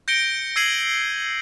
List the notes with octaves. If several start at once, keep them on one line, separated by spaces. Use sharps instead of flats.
G6 A#6 C#7 D7 G7
E6 G#6 C7 D#7 F#7